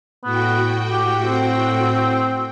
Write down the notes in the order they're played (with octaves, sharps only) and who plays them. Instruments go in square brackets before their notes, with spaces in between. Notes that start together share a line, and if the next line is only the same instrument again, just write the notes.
[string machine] A2 F#4 G5 [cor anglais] B3
[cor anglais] G4
C4